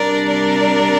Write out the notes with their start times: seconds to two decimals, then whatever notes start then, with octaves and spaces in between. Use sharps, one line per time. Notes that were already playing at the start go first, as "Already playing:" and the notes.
Already playing: C3 G3 D4 A#4 D5
0.30 A#4 D5